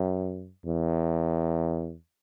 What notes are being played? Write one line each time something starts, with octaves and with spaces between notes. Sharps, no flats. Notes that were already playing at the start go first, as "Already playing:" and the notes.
Already playing: F#2
E2